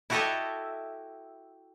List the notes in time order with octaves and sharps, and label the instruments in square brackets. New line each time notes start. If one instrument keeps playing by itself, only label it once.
[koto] E4 F#4 G4 A4 D#5 E5